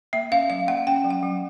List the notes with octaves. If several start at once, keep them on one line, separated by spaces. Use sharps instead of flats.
A#3 E5
C#4 F5
F#3 F5
A#3 F#5
C#4 G5
F#3
F#5
F#3